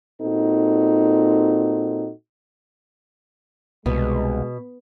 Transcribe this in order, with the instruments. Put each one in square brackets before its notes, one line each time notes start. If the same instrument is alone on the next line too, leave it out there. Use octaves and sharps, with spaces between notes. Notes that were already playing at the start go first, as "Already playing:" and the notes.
[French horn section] A#2 C4 D#4 F#4 A4
[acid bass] C2 [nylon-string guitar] B2 [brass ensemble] G#3